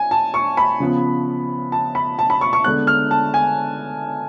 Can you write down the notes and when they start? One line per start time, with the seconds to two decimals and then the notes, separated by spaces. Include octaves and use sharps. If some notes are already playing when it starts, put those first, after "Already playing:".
Already playing: G#5
0.11 A5
0.34 C#6
0.57 B5
0.80 C#3 F3 B3
1.72 A5
1.95 B5
2.19 A5
2.30 B5
2.41 C#6
2.53 C#6
2.64 D3 G#3 B3 F#6
2.87 F6
3.11 A5
3.34 G#5